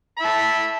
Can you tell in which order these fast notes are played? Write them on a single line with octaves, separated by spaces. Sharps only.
B5 E5 A5